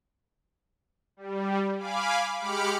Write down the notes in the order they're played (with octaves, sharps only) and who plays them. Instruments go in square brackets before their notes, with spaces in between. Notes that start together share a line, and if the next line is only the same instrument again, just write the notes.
[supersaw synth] G3
F5 G#5 B5 D6
G#3 G4 B5 D6 F6 C#7